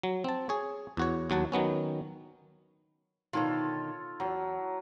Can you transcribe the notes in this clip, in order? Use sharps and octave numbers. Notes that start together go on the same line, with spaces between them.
F#3
C4 A5
G#4 C#5
E2 F#4 C#5
D#2 F#3 F#4 A5
D#3 F#3 B3 C#4
B2 D3 D#3 F4 A4 C#5
E2 F#3